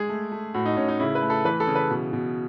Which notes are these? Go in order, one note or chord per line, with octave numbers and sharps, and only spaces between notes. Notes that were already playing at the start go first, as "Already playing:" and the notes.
Already playing: G#3 G#4
A3
A3
A2 F#4
D#4
A2 C#4
D#4
C#3 E4
B4
A3
A4
E3 B4
A4
C#3
B4
B2
B2